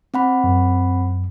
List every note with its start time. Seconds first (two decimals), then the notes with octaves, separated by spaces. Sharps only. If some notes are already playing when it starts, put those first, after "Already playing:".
0.14 C4 F#5 B5
0.44 F#2